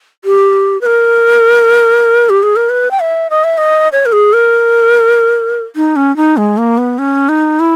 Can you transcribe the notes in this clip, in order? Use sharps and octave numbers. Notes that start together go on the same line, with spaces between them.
G4
B4
A#4
G4
G#4
A#4
B4
G5
E5
D#5
E5
D#5
C#5
A#4
G#4
A#4
D#4
C#4
D#4
G#3
A#3
B3
C#4
D#4
E4